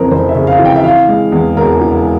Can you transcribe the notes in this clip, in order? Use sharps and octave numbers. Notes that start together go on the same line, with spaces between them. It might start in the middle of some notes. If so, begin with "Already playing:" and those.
Already playing: F2 C#3 E3 A#4 C5
F1 C5
E5
C#3
F5
E3
G5
E5
E3 F5
G#3
E2
E1 A#4
E3